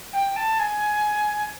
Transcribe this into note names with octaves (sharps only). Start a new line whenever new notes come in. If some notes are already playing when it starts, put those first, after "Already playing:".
G5
A5
G#5